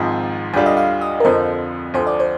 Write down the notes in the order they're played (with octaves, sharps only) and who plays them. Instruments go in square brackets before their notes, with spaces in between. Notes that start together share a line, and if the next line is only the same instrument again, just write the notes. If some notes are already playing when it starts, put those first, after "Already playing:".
Already playing: [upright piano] G#1 G#2 F3 C4
[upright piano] D2 D3 G3 D4 F4 [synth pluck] G5
[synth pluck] D#5
F5
D#5
A#4
[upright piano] F2 D3 F3 [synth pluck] C5
[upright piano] D2 D3 F3 [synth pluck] C5
[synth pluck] D5
C5